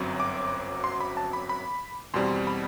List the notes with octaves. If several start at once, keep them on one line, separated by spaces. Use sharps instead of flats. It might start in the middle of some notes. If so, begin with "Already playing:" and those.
Already playing: G1 F#2 F#3 C4
D6
C6
B5
A5
B5
B5
E2 B2 G3 C4 C6
B5